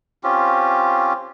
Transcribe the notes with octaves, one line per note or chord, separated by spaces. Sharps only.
C4 C#4 F4 G4